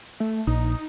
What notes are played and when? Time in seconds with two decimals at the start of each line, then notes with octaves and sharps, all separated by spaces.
0.20 A3
0.47 A#1 D#4